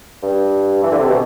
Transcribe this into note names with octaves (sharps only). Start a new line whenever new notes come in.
G2
E3
D3
C3
B2